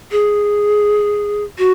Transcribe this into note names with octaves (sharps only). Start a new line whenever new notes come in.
G#4
F#4